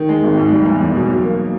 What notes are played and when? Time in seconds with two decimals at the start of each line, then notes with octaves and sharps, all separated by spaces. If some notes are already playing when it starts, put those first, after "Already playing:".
Already playing: D#3
0.09 G#3
0.24 G#1
0.37 G#2
0.52 G3
0.66 E2
0.81 E2
0.95 B2
1.09 F#3
1.24 A#3